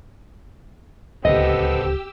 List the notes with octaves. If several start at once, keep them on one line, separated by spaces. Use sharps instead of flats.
D1 C#2 B3 C4 G4 A4 D#5 E6